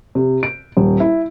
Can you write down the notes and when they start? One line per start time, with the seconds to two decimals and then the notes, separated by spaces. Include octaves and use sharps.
0.15 C3
0.43 D7
0.77 D#1
1.00 E4